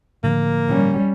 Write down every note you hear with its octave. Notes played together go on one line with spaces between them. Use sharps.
A2 D3 F3 A#3
G3 C#4